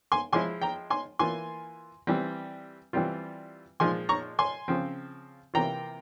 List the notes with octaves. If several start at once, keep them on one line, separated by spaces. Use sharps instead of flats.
G#5 C6
F3 G#3 E4 G#5 C6
G5 A#5
G#5 C6
E3 A#3 F4 G#5 C6
E3 G3 C4
E3 G3 C4 F4
A#2 F3 G#3 G#5 C6
A#5 C#6
G#5 C6
C#3 F3 C4
C3 E3 A#3 F4 G5 A#5